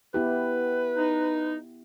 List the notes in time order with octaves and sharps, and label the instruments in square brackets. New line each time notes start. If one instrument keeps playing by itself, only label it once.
[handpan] B3 E4 G4 [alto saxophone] B4
[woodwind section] D#4